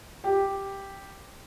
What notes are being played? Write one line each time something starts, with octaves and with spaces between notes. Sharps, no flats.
G4 G5